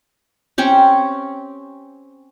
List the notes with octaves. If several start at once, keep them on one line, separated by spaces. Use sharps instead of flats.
C4 C#4 G4